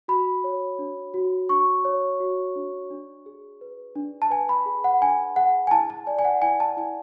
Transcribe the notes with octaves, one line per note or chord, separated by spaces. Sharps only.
F#4 B5
C#5
D4
F#4
D4 C#6
C#5
F#4
D4
D4
G#4
B4
D4
A5
B4 G#5
B5
G#4
F#5
D4 G#5
G#4 F#5
G#5
E4 A5
A5
D5 G#5
G#5
F#5
E4 G#5
A5
E4 G#5